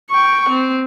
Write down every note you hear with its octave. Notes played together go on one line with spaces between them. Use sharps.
G5 C#6
C4